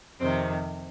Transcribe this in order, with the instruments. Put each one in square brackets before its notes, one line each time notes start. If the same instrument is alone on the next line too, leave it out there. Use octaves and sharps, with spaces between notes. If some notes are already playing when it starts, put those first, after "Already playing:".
[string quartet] F2 C3 D#3 C4